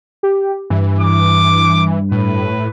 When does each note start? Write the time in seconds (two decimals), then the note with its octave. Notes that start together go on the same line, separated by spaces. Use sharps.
0.23 G4
0.70 G2 E3
1.00 D6
2.11 A2 B4